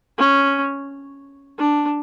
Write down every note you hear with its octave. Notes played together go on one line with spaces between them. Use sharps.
C#4
D4